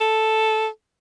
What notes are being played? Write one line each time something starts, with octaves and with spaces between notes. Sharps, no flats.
A4